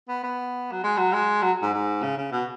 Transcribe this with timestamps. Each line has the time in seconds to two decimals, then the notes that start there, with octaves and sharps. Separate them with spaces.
0.09 B3
0.23 B3
0.72 F#3
0.84 G#3
0.98 F#3
1.13 G#3
1.42 F#3
1.62 G#2
1.73 G#2
2.02 C#3
2.17 C#3
2.32 B2